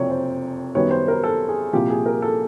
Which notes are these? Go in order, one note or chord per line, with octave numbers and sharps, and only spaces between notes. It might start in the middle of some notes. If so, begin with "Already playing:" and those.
Already playing: F#1 F2 C3 C#5 D5
C5
F#2 D#3 G3 B3 C#5
C5
A#4
A4
G#4
C2 A#2 F3 G4
G#4
A#4
A4